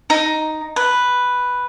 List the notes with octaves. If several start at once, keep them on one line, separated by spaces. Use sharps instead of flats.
D#4
B4